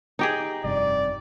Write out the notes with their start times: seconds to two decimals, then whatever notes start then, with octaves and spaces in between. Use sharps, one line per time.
0.19 D#4 G4 G#4
0.64 F1 G2 C3 D5